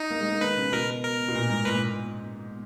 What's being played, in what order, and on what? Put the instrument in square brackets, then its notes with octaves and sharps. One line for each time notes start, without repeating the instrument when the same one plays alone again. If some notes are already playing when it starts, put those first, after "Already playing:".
Already playing: [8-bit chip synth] D#4
[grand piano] A#3
G#3
A#3
[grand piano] D#3 [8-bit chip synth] B4
[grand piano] C#3
[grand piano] B2 [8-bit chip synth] A#4
[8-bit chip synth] A#4
[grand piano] B2
A#2
G#2
[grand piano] A#2 [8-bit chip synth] B4
[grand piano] A#2